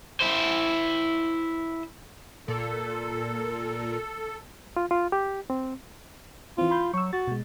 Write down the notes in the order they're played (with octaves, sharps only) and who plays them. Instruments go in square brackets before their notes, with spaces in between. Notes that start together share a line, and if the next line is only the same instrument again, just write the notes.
[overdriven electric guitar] E4 C5
[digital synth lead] A#2 [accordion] A4
[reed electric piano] F4
F4
G4
C4
[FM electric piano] E3 C4 [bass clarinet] F4
[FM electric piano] B5 C6 G6
[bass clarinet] F#3 [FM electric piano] C#6 E6
[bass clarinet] F#4 [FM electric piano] A6
[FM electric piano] B2 G#3